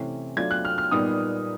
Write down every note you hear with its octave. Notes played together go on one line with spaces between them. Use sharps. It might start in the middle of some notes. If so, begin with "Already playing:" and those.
Already playing: C3 E3 A3 C#4
F#3 A3 D4 F4 G#6
F#6
F6
F6
A#2 G3 B3 D#4 D#6